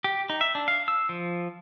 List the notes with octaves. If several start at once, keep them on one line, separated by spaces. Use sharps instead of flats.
G4
D#4
E5
D4
F5
E6
F3